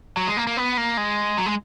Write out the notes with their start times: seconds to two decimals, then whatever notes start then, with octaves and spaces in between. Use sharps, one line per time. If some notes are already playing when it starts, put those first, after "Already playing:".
0.17 F#3
0.27 G#3
0.37 A#3
0.47 A#3
0.57 B3
0.77 A#3
0.97 G#3
1.38 F#3
1.46 G#3